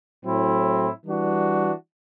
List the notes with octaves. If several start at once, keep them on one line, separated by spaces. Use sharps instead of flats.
A2 F#3 C4 E4
E3 G3 D4 F#4